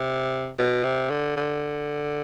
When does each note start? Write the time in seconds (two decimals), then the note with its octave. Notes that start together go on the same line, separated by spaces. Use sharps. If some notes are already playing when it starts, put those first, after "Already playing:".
Already playing: C3
0.59 B2
0.84 C3
1.10 D3
1.37 D3